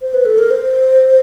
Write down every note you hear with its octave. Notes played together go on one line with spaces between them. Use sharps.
C5
B4
A4
A#4
C5